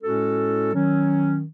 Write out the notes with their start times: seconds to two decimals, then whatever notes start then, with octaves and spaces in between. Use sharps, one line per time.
0.02 A2 G#3 C#4 F#4 A4
0.74 D#3 F#3 C#4